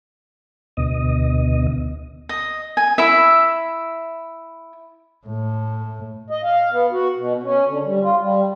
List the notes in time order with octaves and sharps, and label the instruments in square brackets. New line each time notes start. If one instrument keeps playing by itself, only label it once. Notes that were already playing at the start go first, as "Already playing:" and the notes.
[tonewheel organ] D2 B2 D#5
[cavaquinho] D#5
G#5
E4 E5
[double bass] A2
[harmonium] D#5
F5
B3
F#4
B2
C#4
D3
G3
F4
G3